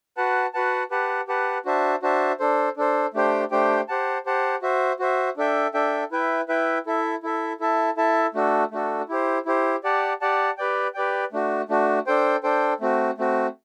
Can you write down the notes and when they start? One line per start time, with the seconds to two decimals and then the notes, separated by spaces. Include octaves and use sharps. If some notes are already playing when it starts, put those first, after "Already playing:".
0.17 F#4 B4 F#5 A5
0.54 F#4 B4 F#5 A5
0.91 G4 B4 F#5 A5
1.28 G4 B4 F#5 A5
1.65 D4 F#4 C5 E5 A5
2.02 D4 F#4 C5 E5 A5
2.40 D4 A4 C5
2.77 D4 A4 C5
3.14 A3 D4 G4 C5 G5
3.51 A3 D4 G4 C5 G5
3.88 G4 C5 F#5 A5
4.26 G4 C5 F#5 A5
4.62 F#4 C5 E5
4.99 F#4 C5 E5
5.37 D4 A4 E5 G5
5.74 D4 A4 E5 G5
6.12 E4 B4 E5 G5
6.48 E4 B4 E5 G5
6.86 E4 A4 E5
7.23 E4 A4 E5
7.60 E4 A4 E5 A5
7.97 E4 A4 E5 A5
8.34 A3 D4 F#4 A4
8.71 A3 D4 F#4 A4
9.09 E4 G4 C5
9.46 E4 G4 C5
9.84 G4 D5 F#5 A5
10.21 G4 D5 F#5 A5
10.58 G4 B4 D5 G5
10.94 G4 B4 D5 G5
11.32 A3 D4 F#4
11.69 A3 D4 F#4
12.07 D4 A4 C5 G5
12.43 D4 A4 C5 G5
12.80 A3 C4 F#4
13.18 A3 C4 F#4